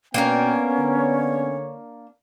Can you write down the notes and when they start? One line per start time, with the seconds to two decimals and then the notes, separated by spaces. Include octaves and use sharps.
0.14 B2 A#3 B3 C#4 D4 A#4 G5
0.79 D3 C#5